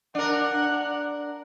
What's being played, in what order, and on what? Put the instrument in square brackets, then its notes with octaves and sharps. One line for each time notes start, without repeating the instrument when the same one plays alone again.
[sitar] D4 A#4 [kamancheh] F#5 F#6